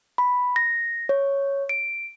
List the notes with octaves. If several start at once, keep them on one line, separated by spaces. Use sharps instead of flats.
B5
A#6
C#5
D7